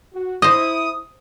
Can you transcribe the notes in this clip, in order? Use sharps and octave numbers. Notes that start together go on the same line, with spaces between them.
F#4
E4 C5 D#5 D#6